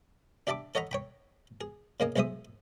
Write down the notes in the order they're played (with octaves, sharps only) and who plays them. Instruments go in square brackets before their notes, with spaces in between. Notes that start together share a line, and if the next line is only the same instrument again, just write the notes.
[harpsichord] D4 G4 E5 A5 B5 D6
A4 C#5 D#5 F#5 A#5 B5
C#5 G5 B5
G#4
C#3 A#3 D#5 G#5
B1 G#3 G#4 C5 E5 D#6